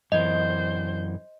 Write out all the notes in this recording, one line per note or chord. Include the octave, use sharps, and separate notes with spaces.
F#2 E3 C5 D#5 G6